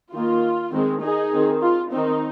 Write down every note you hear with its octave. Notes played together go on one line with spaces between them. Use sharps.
D#3 A#3 F4
D#3 G#3 C4
D#4 G#4
D#3 C4
F4
D#3 C4 D#4